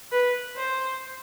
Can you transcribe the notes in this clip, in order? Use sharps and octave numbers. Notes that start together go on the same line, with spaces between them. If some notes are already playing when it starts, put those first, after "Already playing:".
B4
C5